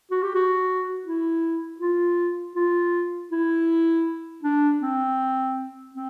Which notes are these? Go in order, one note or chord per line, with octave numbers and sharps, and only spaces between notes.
F#4
G4
F#4
E4
F4
F4
E4
D4
C4
C4